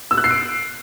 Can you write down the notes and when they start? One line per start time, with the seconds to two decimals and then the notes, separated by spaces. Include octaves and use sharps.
0.11 E6
0.17 F#6
0.24 C7
0.31 D7